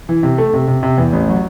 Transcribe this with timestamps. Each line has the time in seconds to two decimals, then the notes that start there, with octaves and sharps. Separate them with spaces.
0.09 E3
0.23 C3
0.38 A3
0.53 C3
0.67 C3
0.83 C3
0.98 E2
1.13 A1
1.29 F#3